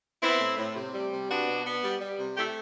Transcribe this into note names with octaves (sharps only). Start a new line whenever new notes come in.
B3 C4 E4
A2
A2
C3
G3
C3
B3 D4 F#4
B2
B3
G3
G3
C3
A3 E4 G4